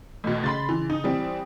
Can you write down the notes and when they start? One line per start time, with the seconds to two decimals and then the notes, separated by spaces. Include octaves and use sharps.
0.24 A1 B2
0.44 C#3 B5 C6 A6
0.69 E3
0.90 D#4 D#6
1.04 E3 G3 C4